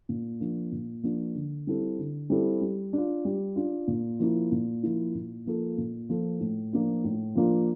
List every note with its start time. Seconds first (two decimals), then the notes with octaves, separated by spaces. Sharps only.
0.09 A#2
0.40 F3 A#3 D4
0.72 A#2
1.03 F3 A#3 D4
1.35 D3
1.67 G3 C4 E4 A4
1.99 D3
2.30 G3 C4 E4 A4
2.61 G3
2.93 D4 F4
3.25 G3
3.56 D4 F4
3.88 A#2
4.19 F3 A#3 E4
4.52 A#2
4.83 F3 A#3 E4
5.15 A#2
5.46 F3 A#3 F4 A4
5.78 A#2
6.09 F3 A#3 F4 A4
6.40 A2
6.73 F3 A#3 D4 F4
7.04 A2
7.35 F3 A#3 D4 F4